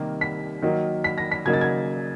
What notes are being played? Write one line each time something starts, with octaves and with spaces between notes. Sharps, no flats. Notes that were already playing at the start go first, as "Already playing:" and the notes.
Already playing: C3 D#3 G3 A#3
B6
D#3 F#3 A#3 D#4
B6
A#6
B6
C#3 F#3 A#3 D#4 G#6
A6
G#6